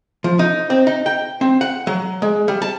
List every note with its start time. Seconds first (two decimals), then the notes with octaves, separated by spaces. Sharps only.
0.24 F3
0.39 D#4
0.70 C4
0.87 D#4
1.06 G5
1.41 C4
1.61 F#5
1.87 F#3
2.22 G#3
2.48 G3
2.62 A5